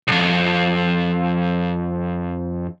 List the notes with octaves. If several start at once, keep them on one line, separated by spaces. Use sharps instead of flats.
B1 F2